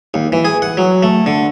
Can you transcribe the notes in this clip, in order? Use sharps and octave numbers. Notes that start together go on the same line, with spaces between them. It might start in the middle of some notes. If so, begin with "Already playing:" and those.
D#2
E3
G#4
F#5
F#3
A3
D3